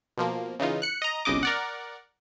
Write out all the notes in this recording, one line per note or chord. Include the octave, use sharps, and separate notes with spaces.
B2 F3 A#3
C#3 E3 D#4 F4
F#6 C#7
D#5 A#5
G1 C2 C#3 D#5 D6
A#4 D5 F#5